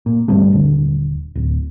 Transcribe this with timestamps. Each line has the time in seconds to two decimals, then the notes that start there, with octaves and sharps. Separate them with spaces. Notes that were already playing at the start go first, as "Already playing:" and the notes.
0.06 A#2
0.28 G1 C3 G3 A3
0.53 D#1 D3
1.35 D1